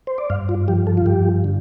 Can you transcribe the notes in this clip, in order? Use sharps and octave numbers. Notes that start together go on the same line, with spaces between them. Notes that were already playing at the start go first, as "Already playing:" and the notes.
C5
D5
G2 F5
F4
F3 G4
A4
F4
G2 G4
D3